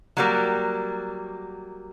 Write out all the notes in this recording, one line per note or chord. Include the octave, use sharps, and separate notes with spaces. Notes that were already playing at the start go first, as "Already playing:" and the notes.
F#3 G3 A#3